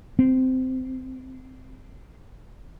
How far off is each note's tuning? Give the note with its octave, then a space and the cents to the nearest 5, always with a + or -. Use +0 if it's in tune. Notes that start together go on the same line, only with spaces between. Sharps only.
C4 -15